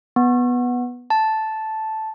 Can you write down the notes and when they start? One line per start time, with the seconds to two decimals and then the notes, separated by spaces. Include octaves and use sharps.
0.16 B3
1.10 A5